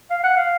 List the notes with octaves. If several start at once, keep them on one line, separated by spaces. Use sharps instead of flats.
F5
F#5
F5